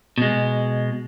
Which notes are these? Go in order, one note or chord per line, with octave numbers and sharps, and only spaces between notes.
B2 G#3